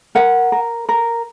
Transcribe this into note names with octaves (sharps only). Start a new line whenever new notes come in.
A#4 F#5
A#4
A#4